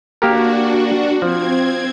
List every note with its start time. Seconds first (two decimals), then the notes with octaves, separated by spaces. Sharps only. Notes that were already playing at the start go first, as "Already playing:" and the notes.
0.22 A#3 D4 F#4 G4 A#4
1.22 F3 C4 G#6